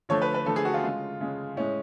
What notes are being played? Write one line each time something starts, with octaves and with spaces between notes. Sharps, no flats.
D3 F3 A3 C#5
B4
B4
D3 F3 A3 A4
G#4
F#4
F4
C#3 G#3
C#3 G#3
A2 G#3 C#4